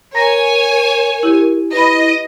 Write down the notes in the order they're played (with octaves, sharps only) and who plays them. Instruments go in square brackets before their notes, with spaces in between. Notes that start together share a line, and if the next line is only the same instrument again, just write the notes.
[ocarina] A#4 [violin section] C#5 G#5 [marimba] A#5 A#6
[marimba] E4 G4
[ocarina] E4 [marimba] B4 B5 [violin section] D#5